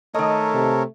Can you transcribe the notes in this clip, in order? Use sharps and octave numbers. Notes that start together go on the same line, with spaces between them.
D#3 A3 A4 A#4 C#5 D#5
C3